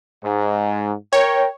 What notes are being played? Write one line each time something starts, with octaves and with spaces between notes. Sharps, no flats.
G#2
A#4 C#5 G5